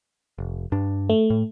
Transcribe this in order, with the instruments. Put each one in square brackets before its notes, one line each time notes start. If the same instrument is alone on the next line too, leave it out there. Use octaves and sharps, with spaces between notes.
[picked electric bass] F1
G2 D4
[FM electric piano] A3
[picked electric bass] A2